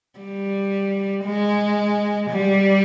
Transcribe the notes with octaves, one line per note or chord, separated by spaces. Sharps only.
G3
G#3
G3